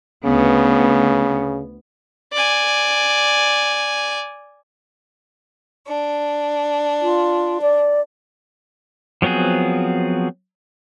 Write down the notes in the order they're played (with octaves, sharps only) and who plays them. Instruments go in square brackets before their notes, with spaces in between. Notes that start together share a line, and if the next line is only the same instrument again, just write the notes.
[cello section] D2 B3 [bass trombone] C#3
[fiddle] D5 G#5
[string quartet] D4
[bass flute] F4
D5
[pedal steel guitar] F3 F#3 B3 C4 G#4